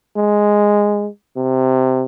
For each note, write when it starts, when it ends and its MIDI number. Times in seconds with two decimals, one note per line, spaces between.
0.17 1.08 56
1.37 2.05 48